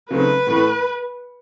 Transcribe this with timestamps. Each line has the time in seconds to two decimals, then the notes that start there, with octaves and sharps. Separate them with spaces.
0.10 C#3 F#3 A3 C4 D#4 B4
0.47 A2 E3 A3